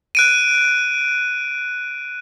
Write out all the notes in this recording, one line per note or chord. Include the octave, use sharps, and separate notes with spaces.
F#6 D7 D#7